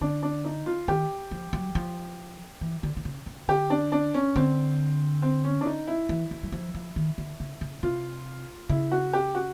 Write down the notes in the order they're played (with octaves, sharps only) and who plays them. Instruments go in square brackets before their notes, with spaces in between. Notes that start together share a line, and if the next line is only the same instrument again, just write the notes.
[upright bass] D3 [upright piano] D4
[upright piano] D4
D#4
F4
[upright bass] D#3 [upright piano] G4
[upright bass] F3
F#3
F3
E3
D3
D3
C#3
C#3
[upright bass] D3 [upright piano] G4
[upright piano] D4
D4
C#4
[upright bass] D3 [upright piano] C4
[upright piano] C4
C#4
D4
D#4
E4
[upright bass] E3
E3
F#3
F3
F3
D#3
D3
C#3
C#3
[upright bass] C3 [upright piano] F4
[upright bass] C#3 [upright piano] E4
[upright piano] F#4
G4
F#4